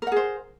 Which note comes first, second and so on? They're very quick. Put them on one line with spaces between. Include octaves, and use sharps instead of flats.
A#4 F#5 G#4 C5